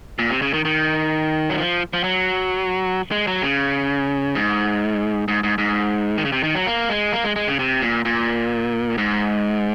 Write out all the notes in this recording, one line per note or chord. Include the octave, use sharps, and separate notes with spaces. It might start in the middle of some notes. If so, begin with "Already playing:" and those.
A#2
C3
C#3
D#3
D#3
F#3
F3
F3
F#3
G#3
F#3
C#3
G#2
G#2
G#2
G#2
D#3
C#3
C3
D#3
F#3
A#3
G#3
A#3
G#3
G#3
C#3
C3
A#2
A#2
G#2